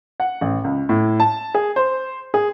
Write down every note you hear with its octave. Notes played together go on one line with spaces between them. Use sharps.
F#5
A1
C#2
A2
A5
G#4
C5
G#4